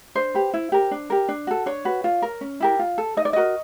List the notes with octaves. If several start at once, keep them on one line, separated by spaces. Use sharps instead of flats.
D4 C5
G4 B4
E4
G4 A#4
D4
G4 A#4
D4
F#4 A4
D4 C#5
F#4 B4
F4
A#4
C#4
E4 G4 A#4
F4
A4
D#4 D#5
D5
F#4 A#4 D#5